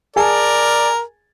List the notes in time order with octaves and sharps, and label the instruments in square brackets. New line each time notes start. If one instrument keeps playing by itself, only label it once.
[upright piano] G#4 G#5 A5 [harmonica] A#4 [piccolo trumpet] D5